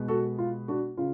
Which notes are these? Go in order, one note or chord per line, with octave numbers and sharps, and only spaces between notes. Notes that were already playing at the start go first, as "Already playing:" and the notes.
Already playing: B2 G#3 B3
F#4 A4
F4
D4 F#4
C#3 F4